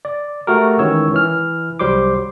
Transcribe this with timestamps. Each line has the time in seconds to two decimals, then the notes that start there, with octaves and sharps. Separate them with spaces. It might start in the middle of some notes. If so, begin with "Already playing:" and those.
0.05 D5
0.47 A3 F#4 G4 A#4
0.79 D#3 E3 G#3 C#4 C#5 E6
1.14 E3 F6
1.79 C2 F#3 G3 C5 C6 D6